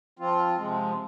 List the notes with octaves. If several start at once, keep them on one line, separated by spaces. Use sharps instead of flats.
F3 C4 F4
C3 F3 G#3